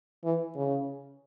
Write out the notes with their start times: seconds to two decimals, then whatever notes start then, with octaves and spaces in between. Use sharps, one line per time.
0.25 E3
0.56 C#3